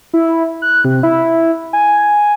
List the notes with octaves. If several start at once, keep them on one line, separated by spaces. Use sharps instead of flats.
E4
F#6
C3
E4
G#5